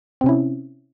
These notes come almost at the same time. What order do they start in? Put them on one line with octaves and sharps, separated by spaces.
C4 C3 C#4 E4